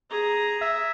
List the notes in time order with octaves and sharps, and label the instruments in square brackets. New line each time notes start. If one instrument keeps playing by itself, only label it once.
[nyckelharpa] G#4 A#5
[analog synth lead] E5